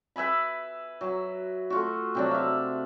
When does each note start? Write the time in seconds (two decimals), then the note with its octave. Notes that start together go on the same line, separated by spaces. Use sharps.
0.16 B4 E5 G#5 B5
1.01 F#3
1.70 A3 F4 F#4
2.15 C3 F#3 D4
2.31 E5 F5